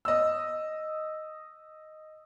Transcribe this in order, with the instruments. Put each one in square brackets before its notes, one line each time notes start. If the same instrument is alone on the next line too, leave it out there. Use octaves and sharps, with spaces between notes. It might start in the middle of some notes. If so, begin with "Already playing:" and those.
[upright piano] D#5 E6